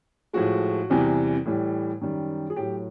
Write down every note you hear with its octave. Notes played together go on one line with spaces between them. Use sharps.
A2 F3 G#3 F#4
E2 C3 E3 G3
A2 E3 G3
F#2 D#3 G3
G#4
A2 F#3 G4